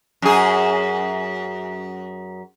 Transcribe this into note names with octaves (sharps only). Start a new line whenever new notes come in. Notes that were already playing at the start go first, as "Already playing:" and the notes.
F#2 G#4